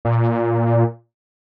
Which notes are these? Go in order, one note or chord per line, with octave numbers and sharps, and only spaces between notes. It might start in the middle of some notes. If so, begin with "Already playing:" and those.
A#2